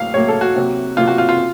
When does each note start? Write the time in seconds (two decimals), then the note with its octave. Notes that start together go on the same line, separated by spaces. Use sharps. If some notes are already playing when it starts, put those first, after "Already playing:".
Already playing: A2 F#3 A#3 F5
0.14 A2 F#3 A#3 C#5
0.28 A4
0.41 F#4
0.56 C3 F#3 A#3
0.97 C3 F#3 A#3 F4
1.08 F#4
1.18 F4
1.29 F4